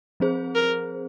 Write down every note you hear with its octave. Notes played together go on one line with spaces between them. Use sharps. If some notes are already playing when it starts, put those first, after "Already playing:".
F3 C4 G#4 C5
A#4